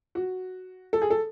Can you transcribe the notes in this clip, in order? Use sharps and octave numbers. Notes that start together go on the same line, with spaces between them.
F#4
A4
G#4
A4